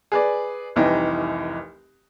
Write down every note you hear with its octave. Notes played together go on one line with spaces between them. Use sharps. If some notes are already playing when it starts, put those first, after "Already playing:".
G#4 B4 D5
F1 C2 E3 D#4 D#5 G5